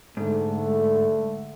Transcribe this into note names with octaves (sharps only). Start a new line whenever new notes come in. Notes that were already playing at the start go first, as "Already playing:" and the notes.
G#2 D3 A3